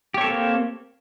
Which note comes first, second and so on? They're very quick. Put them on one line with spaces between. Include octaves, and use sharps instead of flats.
G4 C#5 A4 C4 A#3